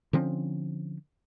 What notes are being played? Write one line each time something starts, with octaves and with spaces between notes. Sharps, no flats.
D3 F3 C4 C#4